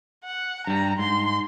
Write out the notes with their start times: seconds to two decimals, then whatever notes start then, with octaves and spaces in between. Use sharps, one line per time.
0.25 F#5
0.67 G2 G3 A#5
0.99 G#2 C6